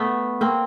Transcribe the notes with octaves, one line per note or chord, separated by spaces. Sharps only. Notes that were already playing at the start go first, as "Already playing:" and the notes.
Already playing: A3 B3
A#3 C4